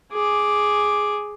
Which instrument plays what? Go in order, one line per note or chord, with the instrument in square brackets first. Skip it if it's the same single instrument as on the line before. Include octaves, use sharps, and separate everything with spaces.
[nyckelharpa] G#4 D6